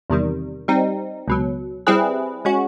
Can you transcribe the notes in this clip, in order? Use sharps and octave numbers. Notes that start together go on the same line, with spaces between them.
E2 C3 D#3 G3
G3 C4 D#4
C#2 B2 F#3
G3 C4 E4 G#4 B4
G#3 C#4 F#4